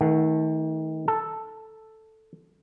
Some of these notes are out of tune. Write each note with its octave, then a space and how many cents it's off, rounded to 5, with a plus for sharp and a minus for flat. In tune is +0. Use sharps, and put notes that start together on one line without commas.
D#3 +35 A3 +0 F#5 +0
A4 +0 A5 +0